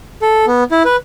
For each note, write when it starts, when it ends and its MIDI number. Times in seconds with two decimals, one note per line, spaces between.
0.22 0.46 69
0.47 0.64 59
0.71 0.83 64
0.85 0.96 71